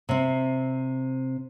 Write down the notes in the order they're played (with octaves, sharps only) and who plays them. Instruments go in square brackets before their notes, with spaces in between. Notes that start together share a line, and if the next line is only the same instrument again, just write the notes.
[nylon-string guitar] C3 C4